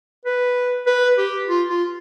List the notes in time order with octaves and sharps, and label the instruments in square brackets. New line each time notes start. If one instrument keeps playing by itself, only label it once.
[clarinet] B4
B4
G4
F4
F4